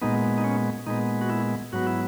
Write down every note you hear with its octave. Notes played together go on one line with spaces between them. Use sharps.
A#2 G#3 B3 D#4
D#4
C#4
A#2 G#3 B3 D#4
F#4
E4
G#2 F#3 B3 F#4
E4